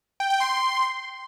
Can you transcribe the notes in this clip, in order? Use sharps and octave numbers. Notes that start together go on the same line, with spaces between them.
G5
G5
C6